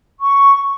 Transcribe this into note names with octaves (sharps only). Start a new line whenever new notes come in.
C#6